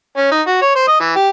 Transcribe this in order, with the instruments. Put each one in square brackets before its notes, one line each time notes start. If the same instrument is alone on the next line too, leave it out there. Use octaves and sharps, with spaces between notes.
[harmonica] C#4
D#4
F#4
C#5
C5
D#5
E3
G4